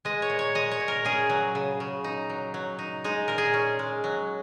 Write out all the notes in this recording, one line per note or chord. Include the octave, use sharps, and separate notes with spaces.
G#3 D#5
C#5
A#2
C#5
G#3 D#5
C#5
A#2
A#4
C#4 G#4
F#3
C#3
C#3
D#4
F#3
F#3
D#4
G#3 D#4
A#2 A#4
G#4
C#4
G#3
F#3